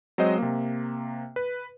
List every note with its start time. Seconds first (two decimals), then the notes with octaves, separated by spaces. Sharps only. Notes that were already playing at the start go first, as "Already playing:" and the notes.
0.18 F#3 G#3 C4 C5 D#5
0.38 C3 A#3
1.36 B4